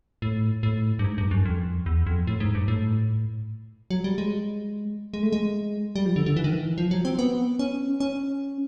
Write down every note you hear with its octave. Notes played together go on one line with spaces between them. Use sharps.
A2
A2
G2
G#2
G2
F#2
F2
E2
F2
A2
G#2
G2
A2
F#3
G3
G#3
G#3
A3
G#3
G3
F3
D3
D3
E3
D#3
E3
F3
F#3
C4
B3
C#4
C#4